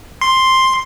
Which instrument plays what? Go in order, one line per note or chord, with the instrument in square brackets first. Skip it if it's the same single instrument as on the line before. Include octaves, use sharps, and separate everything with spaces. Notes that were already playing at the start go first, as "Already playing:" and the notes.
[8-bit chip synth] C6